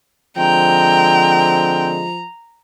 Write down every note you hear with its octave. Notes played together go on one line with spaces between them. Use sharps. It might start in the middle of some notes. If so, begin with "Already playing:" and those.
D3 F3 G#3 C4 G5 A#5